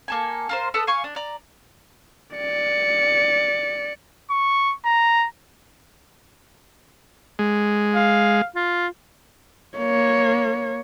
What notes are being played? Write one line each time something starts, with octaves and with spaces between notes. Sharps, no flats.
A#3 A4 G#5
F4 A#4 C5
A4 B4 A5 D#6
F5 G#5 C#6
D4
D5 A#5
D5 C#7
C#6
A#5
G#3
F5
F4
A#3 C#5